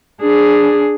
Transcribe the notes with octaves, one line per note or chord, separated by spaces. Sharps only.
D4 G#4